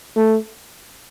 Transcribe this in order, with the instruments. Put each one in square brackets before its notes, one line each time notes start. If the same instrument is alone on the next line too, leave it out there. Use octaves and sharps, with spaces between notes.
[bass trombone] A3